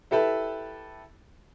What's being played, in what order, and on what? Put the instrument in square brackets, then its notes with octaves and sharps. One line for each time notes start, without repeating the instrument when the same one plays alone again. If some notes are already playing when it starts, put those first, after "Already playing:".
[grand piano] E4 G4 A4 B4 E5